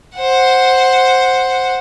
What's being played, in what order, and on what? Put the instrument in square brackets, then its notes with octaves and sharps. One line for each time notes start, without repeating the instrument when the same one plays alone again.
[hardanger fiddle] C5 F#5